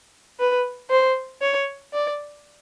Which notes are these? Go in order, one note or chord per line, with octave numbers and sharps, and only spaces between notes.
B4
C5
C#5
D5